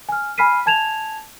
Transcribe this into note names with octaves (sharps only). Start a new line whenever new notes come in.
G#5 F6
G#5 B5 F6 B6 C7 D#7
G#5 A5 G#6 E7 F7